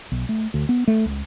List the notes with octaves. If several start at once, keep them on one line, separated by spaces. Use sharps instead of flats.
B1
A3
D2
B3
A3
C#2